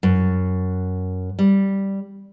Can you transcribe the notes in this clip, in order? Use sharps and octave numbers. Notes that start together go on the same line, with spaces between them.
F#2
G3